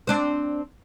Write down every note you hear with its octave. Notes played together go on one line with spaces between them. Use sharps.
C4 D4 C5